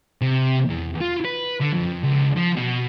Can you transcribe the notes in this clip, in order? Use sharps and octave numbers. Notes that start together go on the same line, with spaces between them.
C3
E2
F4
B4
D3
F2
C#2
F3
B2